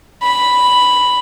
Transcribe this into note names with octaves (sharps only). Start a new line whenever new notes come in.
B5